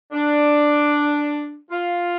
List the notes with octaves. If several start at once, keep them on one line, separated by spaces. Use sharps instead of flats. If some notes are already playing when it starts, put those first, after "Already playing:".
D4
F4